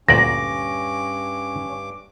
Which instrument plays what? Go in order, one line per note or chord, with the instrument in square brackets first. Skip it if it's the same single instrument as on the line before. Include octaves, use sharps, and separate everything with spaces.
[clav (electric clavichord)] D2 A#2 D5 [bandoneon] G2 D6 [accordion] C#4 [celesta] A#6